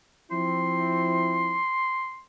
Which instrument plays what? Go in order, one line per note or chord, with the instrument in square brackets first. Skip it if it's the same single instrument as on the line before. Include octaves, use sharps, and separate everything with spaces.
[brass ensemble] F3 C4 E4 [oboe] C6